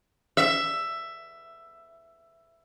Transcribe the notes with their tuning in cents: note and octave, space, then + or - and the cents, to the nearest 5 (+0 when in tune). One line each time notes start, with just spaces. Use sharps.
E5 +10